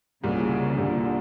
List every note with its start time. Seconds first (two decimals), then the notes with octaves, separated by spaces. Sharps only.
0.23 C2 A#2 C#3 G3
0.77 C2 A#2 D3 G3